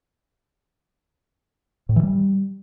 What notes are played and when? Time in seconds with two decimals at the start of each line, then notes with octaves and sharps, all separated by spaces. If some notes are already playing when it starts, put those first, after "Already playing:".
1.89 A2
1.96 E3
2.03 G3